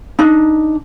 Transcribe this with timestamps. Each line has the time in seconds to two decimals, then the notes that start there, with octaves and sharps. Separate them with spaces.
0.19 D4 D#4